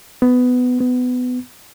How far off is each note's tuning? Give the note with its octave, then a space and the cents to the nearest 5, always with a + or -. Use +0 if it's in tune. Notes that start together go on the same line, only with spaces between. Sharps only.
B3 +15
B3 +20